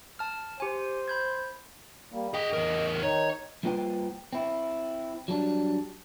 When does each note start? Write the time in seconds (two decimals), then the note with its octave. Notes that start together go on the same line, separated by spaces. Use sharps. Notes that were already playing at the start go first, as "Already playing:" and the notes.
0.19 A5 F6
0.60 G4 C5 G#5
1.08 B5 G6 G#6
2.12 G3 A#3
2.34 G#4 D#5 G5
2.53 E2 A#4
3.03 D#3 D#4 C#5
3.63 G3 A#3 F4 B4 C5 G5
4.33 C4 E4
5.28 F#3 G3 D4